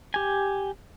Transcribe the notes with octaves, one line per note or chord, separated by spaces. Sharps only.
G4 G#5